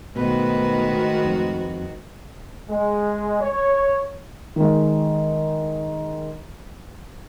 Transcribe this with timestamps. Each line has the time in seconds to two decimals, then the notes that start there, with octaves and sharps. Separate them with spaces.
0.16 G#2 B2 D#3 A3 F#4 B4
1.26 F2
2.69 G#3
3.41 C#5
4.56 D#3 G#3